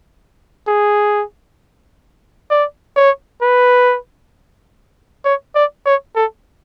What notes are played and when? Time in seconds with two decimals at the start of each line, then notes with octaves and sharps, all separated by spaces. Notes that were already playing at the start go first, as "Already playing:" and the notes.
0.68 G#4
2.50 D5
2.96 C#5
3.42 B4
5.25 C#5
5.55 D5
5.86 C#5
6.16 A4